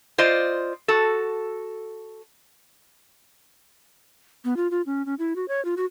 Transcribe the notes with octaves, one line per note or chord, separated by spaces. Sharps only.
F4 C5 D5 D#5
F#4 A4
B3
F4
F4
C#4
C#4
E4
F#4
C#5
F4
F#4